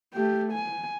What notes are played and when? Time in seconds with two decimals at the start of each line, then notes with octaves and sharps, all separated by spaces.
0.14 A3 G4
0.53 G#5